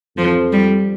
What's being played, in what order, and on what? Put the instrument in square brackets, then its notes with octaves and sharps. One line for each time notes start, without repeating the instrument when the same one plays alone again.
[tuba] F2 [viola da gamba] F3
[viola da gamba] G3